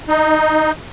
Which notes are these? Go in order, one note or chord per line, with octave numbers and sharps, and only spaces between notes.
D#4